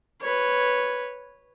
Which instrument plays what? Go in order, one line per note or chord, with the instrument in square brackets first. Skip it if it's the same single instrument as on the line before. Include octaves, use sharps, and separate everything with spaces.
[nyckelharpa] B4 C#5